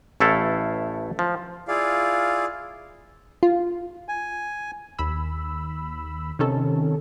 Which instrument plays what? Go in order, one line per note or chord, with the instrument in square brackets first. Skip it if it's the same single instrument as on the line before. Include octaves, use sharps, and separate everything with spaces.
[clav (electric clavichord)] A1 A3 E4 A4 F5
F3
[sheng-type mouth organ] E4 F4 G#4 D5 F5
[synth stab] F4
[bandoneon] G#5
[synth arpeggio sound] D#2 B5 E6
C3 D#3 C#4 A4